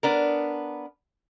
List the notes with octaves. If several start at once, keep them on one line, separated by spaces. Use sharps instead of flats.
B3 D4 A#4